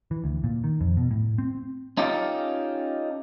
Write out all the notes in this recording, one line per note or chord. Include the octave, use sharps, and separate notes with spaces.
E3
D2
A#2
D#3
F2
B2
A2
C4
C#4 D#4 F4 G4 A4